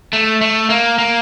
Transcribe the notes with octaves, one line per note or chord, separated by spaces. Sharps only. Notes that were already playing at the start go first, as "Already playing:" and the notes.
A3
A3
A#3
A#3